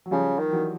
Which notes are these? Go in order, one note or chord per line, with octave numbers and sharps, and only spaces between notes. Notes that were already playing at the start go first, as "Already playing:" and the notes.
F#3
C#3 F3 G3
D#3
E3 F#3